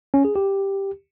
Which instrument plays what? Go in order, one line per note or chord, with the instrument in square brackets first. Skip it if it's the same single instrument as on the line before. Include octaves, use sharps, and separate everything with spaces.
[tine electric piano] C#4
G#4
G4